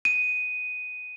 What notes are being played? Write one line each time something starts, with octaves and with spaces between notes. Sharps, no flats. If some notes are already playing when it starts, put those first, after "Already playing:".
D#7